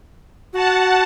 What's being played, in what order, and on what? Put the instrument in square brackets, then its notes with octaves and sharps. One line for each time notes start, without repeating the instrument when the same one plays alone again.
[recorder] F#4 [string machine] F#5 A5